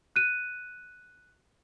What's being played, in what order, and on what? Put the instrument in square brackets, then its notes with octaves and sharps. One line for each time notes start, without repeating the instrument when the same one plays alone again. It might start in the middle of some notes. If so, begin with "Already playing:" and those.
[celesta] F#6 D#7